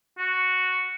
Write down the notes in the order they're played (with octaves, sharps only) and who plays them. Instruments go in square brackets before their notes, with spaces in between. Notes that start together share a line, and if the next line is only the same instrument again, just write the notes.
[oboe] F#4